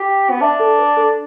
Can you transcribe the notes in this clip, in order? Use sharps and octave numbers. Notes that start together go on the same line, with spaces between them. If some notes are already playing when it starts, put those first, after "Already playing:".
Already playing: G4
B3
D4 E5 A5
A4
B4
A4